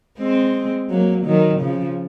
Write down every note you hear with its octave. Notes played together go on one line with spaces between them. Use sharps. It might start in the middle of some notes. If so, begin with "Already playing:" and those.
G#3 C4
F#3 A#3
D#3 F#3
C#3 F3